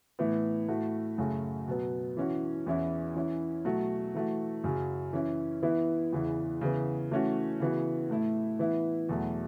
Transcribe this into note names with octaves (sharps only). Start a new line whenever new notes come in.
A2 E3 B3 E4
A2 A3 F#4
F#2 C#3 A3 F#4
B2 F#3 B3
E3 C#4 F#4
E2 E3 C#4 E4
E3 C#4 E4
B2 F#3 A3 F#4
E3 A3 F#4
F#2 C#3 F#3
E3 C#4 E4
E3 B3 E4
E2 C#3 E3
C#3 E3 B3
E3 A3 C#4 F#4
C#3 E3 B3 F#4
A2 A3 E4
E3 B3 E4
E2 B2 F#3 A3